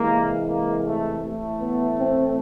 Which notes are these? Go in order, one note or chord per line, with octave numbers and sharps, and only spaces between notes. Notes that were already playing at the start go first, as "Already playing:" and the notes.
Already playing: C3 E3 G#3 A#3
A#3
A3
A2 E3 A3
B3
C4